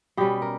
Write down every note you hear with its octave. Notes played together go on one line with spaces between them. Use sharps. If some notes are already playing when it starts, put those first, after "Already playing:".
B2 G3 C#4 G4
A#4